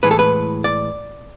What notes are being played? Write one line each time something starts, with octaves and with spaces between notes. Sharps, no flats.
A2 E3 G#3 B4
A4
B4
D5